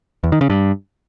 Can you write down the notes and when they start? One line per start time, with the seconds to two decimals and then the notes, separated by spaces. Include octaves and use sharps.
0.24 E2
0.32 D#3
0.41 C#3
0.50 G2